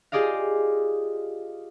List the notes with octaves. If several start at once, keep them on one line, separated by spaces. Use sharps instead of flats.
F4 G4 G#4 D5 D#5 F5